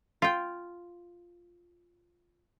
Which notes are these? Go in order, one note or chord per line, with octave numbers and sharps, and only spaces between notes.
F4 G5